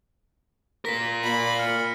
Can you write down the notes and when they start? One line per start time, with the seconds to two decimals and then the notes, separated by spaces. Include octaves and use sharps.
0.85 F4 A#4 A#6 B6
1.23 A#2 B5
1.59 F6 C#7